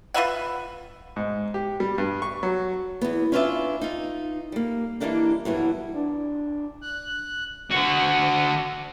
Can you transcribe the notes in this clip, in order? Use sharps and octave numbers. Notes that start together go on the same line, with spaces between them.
F4 B4 E5 F#5
G#2
G4
G3
G2
C#6
F#3
E2 B3
C#4 D4 F4 B4 D5 E5
D#4 F4
G3 A#3
E3 F#3 G3 A#3 D4 D#4
G2 E3 F#3 B3
D4
F#6
D3 F#4